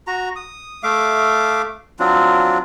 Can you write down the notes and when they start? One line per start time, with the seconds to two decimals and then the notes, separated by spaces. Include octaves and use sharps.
0.07 F#4 A#5
0.36 D#6
0.83 A3 E5 F5 D6
1.99 F#3 C4 D4 F4